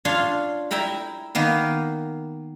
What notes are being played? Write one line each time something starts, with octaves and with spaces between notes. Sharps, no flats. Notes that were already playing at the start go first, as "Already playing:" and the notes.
D4 F4 C#5 F5 C6
E4 E5 G5 A#5 B5
D#3 A#3 B3